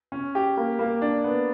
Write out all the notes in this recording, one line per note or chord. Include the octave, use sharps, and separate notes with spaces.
C#4
G4
A#3
A#3
D4
B3